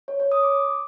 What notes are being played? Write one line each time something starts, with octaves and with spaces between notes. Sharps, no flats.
C#5
C#5
D#6
D6